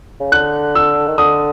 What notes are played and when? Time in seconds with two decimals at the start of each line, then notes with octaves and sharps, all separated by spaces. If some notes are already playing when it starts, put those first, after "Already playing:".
0.20 C#3
0.32 D3 F#6
0.75 E6
1.07 D#3
1.18 D3 D#6